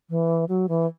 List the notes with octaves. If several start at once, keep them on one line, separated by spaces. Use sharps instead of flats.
E3
F#3
E3